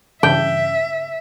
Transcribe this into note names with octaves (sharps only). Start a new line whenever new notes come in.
G2 C#3 E3 D4 E5 G5